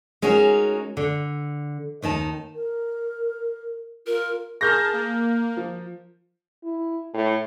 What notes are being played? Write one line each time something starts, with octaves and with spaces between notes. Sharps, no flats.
G#3 C#4 D#4 F#4 G#4 A#4
D3
D#2 D#3 D#4 A5
A#4
F4 A#4
G#4 A#4 A5 F6 G6 A#6
A#3
F3
E4
A2